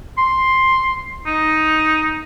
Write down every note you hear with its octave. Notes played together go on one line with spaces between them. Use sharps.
C6
D#4